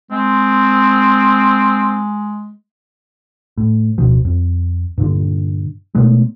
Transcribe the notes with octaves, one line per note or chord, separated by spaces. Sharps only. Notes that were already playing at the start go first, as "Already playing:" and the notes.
G#3 C4
A2
D1 B2 F3
F2
G2 A#2 D3
B2 G#3 A3 B3